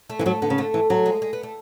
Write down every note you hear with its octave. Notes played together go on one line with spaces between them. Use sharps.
A3
E3 G#3
F#3 A3
D3 B3
C#3
D3 A3
E3
F#3 A3
G#3
G#3
B3
A3